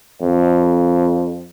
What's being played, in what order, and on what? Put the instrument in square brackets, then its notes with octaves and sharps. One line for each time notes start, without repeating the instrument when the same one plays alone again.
[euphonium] F2